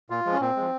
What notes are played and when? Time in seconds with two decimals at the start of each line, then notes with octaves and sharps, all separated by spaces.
0.10 A#2 F4
0.26 F3 G#3
0.32 C#4
0.41 A#2 C4
0.56 F3 G#3